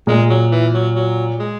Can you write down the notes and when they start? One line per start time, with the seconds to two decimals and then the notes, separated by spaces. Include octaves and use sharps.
0.07 A#2 G#3
0.30 F#3
0.51 E3
0.74 F#3
0.95 F#3
1.39 G#3